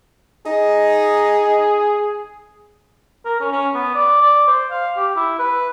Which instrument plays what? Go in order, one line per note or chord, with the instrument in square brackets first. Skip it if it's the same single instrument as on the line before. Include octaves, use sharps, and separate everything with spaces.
[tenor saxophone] D#4 [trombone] G#4
[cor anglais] A#4
C#4
C#4
B3
D5
D5
C5
F5
G4
E4
B4